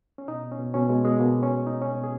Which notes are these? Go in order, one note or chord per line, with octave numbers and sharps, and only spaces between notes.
C#4
B2 D#4
B2
C#4
B2
B2 C#4
B2 G#3
B2 G#3
B2 A#3
B2
C#4
B2
B2 D#4
B2 C#4
B2
G#4